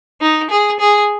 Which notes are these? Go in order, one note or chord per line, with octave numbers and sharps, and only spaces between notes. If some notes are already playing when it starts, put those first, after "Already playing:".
D#4
G#4
G#4